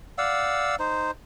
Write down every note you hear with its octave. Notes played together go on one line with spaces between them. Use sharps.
D5 F5 F#5 E6
D#4 C5